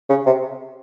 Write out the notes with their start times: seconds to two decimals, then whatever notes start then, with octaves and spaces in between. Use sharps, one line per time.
0.10 C#3
0.26 C3